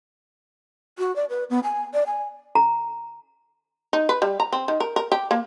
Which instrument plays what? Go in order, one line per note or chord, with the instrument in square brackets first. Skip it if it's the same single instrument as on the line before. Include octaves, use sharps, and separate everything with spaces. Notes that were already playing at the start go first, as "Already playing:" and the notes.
[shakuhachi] F#4
D5
B4
B3
G#5
D5
G#5
[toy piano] A#5
[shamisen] D#4
B4
G3
A#5
C4
D#3
A#4
A#4
G4
A#3